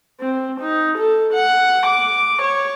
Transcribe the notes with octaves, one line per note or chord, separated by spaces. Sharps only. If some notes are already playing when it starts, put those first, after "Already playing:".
C4
D#4
A4
F#5
D6
C#5